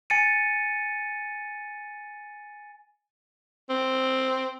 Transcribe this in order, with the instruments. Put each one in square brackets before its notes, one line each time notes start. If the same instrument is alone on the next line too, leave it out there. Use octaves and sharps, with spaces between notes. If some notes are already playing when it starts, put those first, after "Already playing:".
[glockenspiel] G#5 A6 C#7 D#7
[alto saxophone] C4